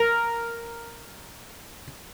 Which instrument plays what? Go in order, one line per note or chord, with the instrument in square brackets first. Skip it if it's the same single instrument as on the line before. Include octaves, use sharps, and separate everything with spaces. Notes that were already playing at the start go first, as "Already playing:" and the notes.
Already playing: [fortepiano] A#4